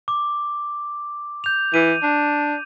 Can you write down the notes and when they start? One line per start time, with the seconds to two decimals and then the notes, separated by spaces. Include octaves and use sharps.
0.08 D6
1.44 G6 F7
1.74 E3 D#7
2.03 D4